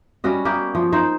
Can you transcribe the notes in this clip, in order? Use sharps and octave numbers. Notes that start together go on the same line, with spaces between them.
G3 C#4 F#4 D#5
A#3 B3 G4
F3
D#4 C5